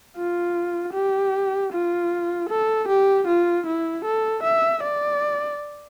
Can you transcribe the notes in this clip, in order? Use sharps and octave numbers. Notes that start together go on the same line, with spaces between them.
F4
G4
F4
A4
G4
F4
E4
A4
E5
D5